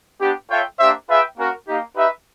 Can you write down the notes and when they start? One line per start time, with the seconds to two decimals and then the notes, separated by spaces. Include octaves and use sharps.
0.20 B3 D4 G4
0.50 F4 A4 C#5 E5 G5
0.78 A#3 D4 G4 C5 E5
1.07 F4 G#4 B4 E5 G5
1.36 A#3 C#4 F#4 A#4
1.66 A#3 D#4 G4
1.95 D#4 G4 B4 E5